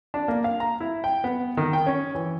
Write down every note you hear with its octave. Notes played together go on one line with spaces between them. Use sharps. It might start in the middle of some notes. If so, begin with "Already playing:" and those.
D4
A#3
F5
A#5
E4
G5
B3
D#3
G5
C#4
E3